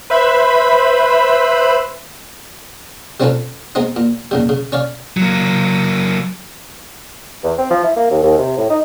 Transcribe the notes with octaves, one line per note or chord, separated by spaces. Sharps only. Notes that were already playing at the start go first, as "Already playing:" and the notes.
B4 C5 E5 B5
G3 C4 C#4 F4 A4 B4
G#3 B3 C4 D#4
A#2
D#2 C#3 G3
C#3
C#4 C#5 D5 F5
F#3 A#3
E2
C4
F3
E4
A#3
D#2
D#2
C3
A2
D#4